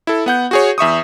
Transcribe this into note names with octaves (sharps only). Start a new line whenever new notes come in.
E4 A4
B3 F#5 G6
F#4 G#4 C#5
E2 E5 C#6 D#6